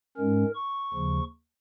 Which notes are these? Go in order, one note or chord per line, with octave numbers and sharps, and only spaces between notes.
G#2 G#3 C#4 A#4
C#6
D#2 C#3 F3